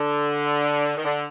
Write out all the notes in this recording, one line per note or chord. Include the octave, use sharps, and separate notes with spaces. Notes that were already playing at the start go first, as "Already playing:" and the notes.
Already playing: D3
D#3
D3